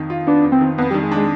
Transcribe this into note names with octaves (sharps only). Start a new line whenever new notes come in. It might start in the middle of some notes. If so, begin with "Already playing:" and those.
Already playing: F2 D#3
F4
B3 D4
F2
C4
D#3
F2 B3
D#3 G3
G#3
D4
G#3